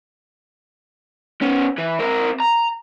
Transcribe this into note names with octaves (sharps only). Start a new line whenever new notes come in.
B3 C#4
E3
C4 A#4
A#5